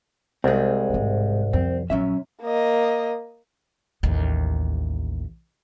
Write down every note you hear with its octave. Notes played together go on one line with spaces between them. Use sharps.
C2 G#3 C4
A1 G#2
F2 C4 C#4
A#1 F#2 C#4 E5
A#3 D#5
A1 D#2